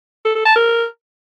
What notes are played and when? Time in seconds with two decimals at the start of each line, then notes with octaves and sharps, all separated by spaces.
0.25 A4
0.35 A4
0.45 A5
0.56 A#4